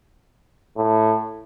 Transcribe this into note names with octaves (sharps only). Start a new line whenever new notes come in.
A2